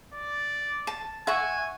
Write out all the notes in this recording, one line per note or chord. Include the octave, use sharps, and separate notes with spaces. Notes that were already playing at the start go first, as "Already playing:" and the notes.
D5
A5
E5 F#5 G#5 C#6